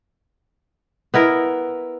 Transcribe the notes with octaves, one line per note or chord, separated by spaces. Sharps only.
B3 E4 A#4